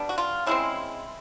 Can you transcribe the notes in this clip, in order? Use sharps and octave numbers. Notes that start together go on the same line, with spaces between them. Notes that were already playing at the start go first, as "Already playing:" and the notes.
Already playing: G3 B3 D4
F#4
F4
C#3 E3 G#3 C4 E4